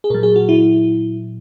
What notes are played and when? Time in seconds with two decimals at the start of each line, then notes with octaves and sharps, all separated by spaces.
0.04 G#4
0.10 A#2 F#3 A#4
0.23 G#4
0.36 F#4
0.49 E4